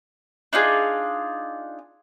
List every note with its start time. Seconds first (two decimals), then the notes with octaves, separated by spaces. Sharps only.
0.53 D4 D#4 F4 G#4